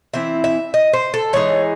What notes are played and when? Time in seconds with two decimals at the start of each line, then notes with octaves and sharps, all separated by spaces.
0.14 E3 C4 E4 E5
0.44 E5
0.74 D#5
0.93 C5
1.14 A4
1.33 E3 G#3 D#4 C#5